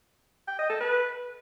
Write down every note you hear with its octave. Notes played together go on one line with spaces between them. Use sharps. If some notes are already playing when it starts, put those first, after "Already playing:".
G5
D#5
A4
B4